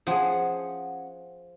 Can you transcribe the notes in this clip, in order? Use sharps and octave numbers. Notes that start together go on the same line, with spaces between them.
F3 C#4 G#4 F#5